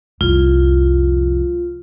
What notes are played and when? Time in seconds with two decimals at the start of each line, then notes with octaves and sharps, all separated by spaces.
0.21 C2 F2 F4